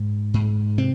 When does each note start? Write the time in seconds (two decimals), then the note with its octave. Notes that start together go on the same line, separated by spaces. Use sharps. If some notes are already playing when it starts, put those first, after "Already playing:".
Already playing: G#2
0.34 G#2
0.78 C3 C4